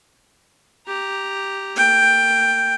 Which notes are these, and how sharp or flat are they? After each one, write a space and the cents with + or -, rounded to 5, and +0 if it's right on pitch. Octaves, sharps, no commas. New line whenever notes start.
G4 +0 A#5 +0
A#3 -40 G5 +5